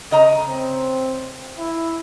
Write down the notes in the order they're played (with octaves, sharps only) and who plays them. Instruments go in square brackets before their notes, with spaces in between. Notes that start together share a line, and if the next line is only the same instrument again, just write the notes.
[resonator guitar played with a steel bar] C#3 D#5 A#5
[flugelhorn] C4
E4